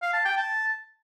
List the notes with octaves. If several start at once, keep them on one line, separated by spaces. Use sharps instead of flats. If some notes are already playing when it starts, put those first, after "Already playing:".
F5
A5
G5
A5